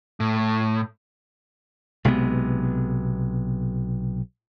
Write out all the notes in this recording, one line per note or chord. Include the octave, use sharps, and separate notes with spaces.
A2
B1 C3 G#3 B3